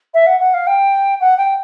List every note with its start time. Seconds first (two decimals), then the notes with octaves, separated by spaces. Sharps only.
0.14 E5
0.27 F#5
0.40 F#5
0.54 F5
0.67 G5
1.21 F#5
1.38 G5